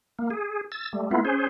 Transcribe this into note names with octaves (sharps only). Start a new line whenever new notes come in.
A#3
G#4
E6 A6
G3 A3
A3 B3 E4 F4
C#4 G#4 C5